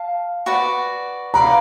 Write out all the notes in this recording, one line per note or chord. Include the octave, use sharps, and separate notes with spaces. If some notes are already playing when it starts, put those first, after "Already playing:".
Already playing: F5 A5
F#4 B4 D5
B4 D5 F5 A#5